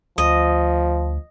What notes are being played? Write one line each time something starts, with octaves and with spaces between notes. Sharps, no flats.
D2 F3 D#5